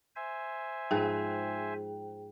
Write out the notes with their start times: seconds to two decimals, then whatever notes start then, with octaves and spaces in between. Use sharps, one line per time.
0.16 C5 E5 G#5
0.91 G#2 F3 G#4 B4 G5